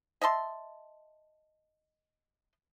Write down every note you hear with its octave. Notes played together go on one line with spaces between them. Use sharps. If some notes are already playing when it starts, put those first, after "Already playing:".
D#5 E5 A5 C6